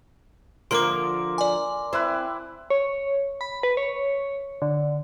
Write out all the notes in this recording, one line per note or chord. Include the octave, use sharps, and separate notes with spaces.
D3 F3 A#3 A#4 F5 C6 D6 D7
D5 G#5
C4 E4 B4
C#5
B5
B4
C#5
D3